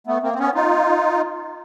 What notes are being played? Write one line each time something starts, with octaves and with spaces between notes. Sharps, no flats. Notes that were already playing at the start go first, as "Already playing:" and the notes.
A3 B3
A#3 C4
C4
B3 C#4
D#4 F4